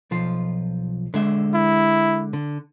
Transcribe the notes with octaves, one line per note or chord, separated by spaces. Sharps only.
B1 F3 F4
D3 G#3 E5
E4
D3